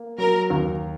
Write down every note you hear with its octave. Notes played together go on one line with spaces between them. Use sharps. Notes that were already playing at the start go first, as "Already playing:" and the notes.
Already playing: A#3
F#3 A#4
D#2